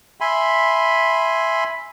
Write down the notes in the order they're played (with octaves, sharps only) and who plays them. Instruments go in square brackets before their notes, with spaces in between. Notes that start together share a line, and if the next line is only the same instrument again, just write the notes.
[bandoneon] E5 G#5 B5 C6